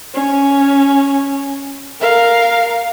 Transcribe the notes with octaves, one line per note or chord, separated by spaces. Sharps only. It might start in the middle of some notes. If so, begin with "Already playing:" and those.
C#4
A#4 F5